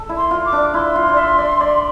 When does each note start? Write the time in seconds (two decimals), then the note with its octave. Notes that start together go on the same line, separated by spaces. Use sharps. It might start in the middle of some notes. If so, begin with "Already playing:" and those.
Already playing: A4
0.09 E4
0.17 C6
0.31 F4
0.46 D6
0.53 D4
0.74 E4 C6
0.96 F4
1.09 D5
1.17 E5
1.38 D5
1.61 D5